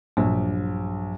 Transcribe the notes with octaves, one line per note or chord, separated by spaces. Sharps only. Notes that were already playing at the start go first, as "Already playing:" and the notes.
A#1 G2 F#3